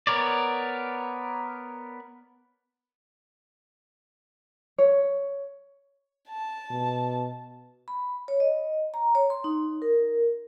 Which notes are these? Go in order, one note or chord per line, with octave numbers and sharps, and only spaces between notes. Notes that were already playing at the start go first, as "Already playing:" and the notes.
B3 A#4 C#5 D5
C#5
A5
B2
B5
C#5
D#5
A#5
C#5
C6
D#4
A#4